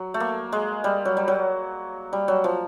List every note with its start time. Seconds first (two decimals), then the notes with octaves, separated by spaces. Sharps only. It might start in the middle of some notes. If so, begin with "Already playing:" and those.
Already playing: F#3
0.14 A3
0.20 A#3
0.52 G#3
0.84 G3
1.05 F#3
1.17 G3
1.28 F#3
2.13 G3
2.28 F#3
2.44 F3